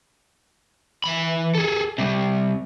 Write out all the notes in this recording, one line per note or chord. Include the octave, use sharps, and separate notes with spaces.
E3 B5
G#4 A4
C3 G3